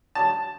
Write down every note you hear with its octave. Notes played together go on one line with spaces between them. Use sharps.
A5